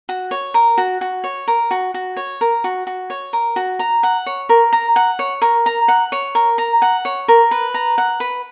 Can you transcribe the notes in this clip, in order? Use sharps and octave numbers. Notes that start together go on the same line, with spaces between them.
F#4
C#5
A#4
F#4
F#4
C#5
A#4
F#4
F#4
C#5
A#4
F#4
F#4
C#5
A#4
F#4
A#5
F#5
C#5
A#4
A#5
F#5
C#5
A#4
A#5
F#5
C#5
A#4
A#5
F#5
C#5
A#4
B4
A#5
F#5
B4